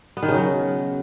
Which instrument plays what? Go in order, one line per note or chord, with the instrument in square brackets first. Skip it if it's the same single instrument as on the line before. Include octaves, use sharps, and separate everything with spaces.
[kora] B3
D#3
C#3
F#3